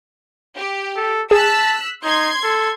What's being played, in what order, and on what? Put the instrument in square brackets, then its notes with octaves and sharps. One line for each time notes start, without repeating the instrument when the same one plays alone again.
[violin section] G4
[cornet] A4
[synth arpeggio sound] G#4 [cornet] A5 [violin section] E6 F#6 B6
[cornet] D#4 [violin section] C6 G#6
[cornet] A4